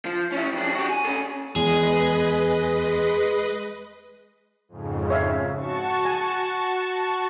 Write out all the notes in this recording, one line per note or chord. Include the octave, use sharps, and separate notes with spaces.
F3
C#4 E4
F2 D4
F#4 G4
G#5
C#4 A4
E2 G#3 G#4 B4 D#5
F2 G#2 C#3
C#5 E5 F5
F#4 A5 C#6
G#5